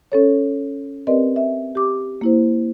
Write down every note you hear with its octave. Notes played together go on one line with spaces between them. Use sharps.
C#4 A4 C#5
C4 G4 A#4 B4 D5 D#5
E5
G4 D6
A#3 E4 C5